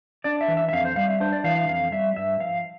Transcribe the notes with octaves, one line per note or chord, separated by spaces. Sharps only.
D4 D5
E5
E3
E5
E5
F2 F5
C5
G3 F5
E5
D4 C5
D5
E3 F5
F5
F2 F5
G3 E5
G2 E5
F3 F5